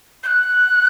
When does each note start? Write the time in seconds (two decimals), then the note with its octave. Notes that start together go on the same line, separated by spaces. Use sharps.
0.23 G6
0.27 F#6